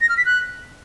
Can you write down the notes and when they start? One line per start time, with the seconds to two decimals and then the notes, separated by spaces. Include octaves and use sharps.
0.01 A#6
0.09 F6
0.17 B6
0.26 F#6